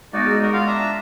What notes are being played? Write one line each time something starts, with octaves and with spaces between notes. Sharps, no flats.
G#3 B3 D#4 F#4 D5
G#4
G#3 D#4 F#4 A#4 C#6
F4 F5 F#5
D4 E5 A#5